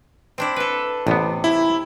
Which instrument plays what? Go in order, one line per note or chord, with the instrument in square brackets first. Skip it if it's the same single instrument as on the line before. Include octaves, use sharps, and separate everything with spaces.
[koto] C4 D4 E4
A4 B4
[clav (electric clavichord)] A1 B3 [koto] C3
[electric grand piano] E4